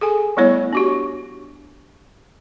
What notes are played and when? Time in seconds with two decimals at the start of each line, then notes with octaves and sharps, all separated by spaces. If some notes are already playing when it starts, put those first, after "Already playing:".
0.01 G#4 A4 G#5
0.37 G3 A3 B3 E4 C#5
0.73 D4 F#4 G4